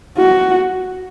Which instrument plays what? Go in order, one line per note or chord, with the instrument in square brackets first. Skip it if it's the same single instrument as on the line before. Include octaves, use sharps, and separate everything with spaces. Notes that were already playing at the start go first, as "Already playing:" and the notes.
[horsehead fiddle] F#4